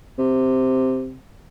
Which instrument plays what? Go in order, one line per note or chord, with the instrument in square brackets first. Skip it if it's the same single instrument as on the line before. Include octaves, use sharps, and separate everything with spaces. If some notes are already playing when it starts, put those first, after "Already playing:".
[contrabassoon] C3